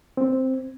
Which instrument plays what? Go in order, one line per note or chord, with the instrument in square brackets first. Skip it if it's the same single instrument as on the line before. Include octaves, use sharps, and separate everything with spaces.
[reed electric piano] C4